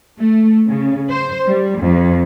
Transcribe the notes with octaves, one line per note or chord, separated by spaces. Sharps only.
A3
C#3
C5
G3
F2